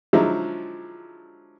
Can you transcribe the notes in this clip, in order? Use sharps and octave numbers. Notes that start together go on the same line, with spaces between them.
D3 F3 F#3 G#3 D#4 E4